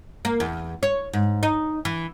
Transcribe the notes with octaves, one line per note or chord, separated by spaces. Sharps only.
A#3
E2
C#5
G#2
D#4
E3